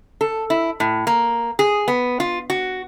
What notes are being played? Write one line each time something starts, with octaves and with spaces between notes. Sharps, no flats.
A4
E4
A2
A#3
G#4
B3
F4
F#4